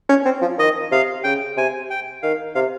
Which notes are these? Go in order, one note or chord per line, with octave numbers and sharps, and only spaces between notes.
C#4
C4
F3
D#3 D#5
C3 F5
C#3 G5
C3 G#5
G5
D#3 F5
C3 F5